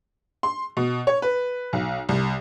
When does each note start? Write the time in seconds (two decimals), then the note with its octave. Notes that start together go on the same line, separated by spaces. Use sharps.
0.43 C6
0.77 B2
1.07 C#5
1.22 B4
1.73 B1
2.09 C2